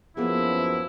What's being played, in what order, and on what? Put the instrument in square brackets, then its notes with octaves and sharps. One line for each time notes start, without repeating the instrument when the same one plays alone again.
[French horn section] F#2 F3 [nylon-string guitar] A#3 B3 G#4 [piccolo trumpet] E4